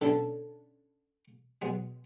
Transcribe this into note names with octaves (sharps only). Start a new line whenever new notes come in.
B2 D3 C#4 D4 E4 A4
B2 F#3 G#3